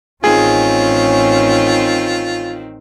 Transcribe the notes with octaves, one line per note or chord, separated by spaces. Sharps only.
A1 D#3 C4 C#4 F4 G#4